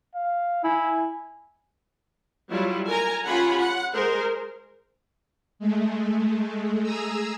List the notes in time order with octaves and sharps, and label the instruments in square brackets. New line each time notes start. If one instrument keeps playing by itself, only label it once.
[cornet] F5
[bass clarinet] E4 [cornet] G#5
[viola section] F#3 G3 E4 F4
A#4 G#5 A#5
C#4 F4 G4 F#5 G#5 B5
F#5
G#3 G#4 A#4 C5
[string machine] G#3 A3
G#4 G#5 A#5 E6